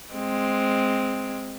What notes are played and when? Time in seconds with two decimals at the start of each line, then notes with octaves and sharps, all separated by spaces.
0.14 G#3 C4